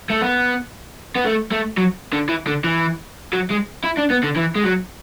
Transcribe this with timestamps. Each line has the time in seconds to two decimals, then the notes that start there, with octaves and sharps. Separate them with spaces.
0.10 A3
0.21 B3
1.16 B3
1.26 A3
1.51 A3
1.77 F#3
2.13 D3
2.29 E3
2.47 D3
2.64 E3
3.33 F#3
3.51 G#3
3.85 E4
3.98 D4
4.11 B3
4.24 D3
4.37 E3
4.56 G#3
4.64 F#3